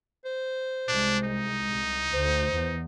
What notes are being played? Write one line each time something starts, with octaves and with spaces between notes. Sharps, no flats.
C5
C2 G#3 D4
D#4
C2
D2 C5
E2